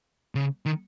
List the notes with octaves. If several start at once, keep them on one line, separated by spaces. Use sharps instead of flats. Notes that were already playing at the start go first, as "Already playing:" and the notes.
C#3
D#3